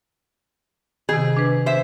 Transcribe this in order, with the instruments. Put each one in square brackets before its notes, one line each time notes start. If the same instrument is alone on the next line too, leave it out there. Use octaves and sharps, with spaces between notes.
[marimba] C3 D#3 [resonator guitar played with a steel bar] G#4
[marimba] D4 B4
[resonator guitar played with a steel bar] C5 E5